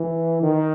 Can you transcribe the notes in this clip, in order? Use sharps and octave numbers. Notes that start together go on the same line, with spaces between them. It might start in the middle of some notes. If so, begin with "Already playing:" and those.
Already playing: E3
D#3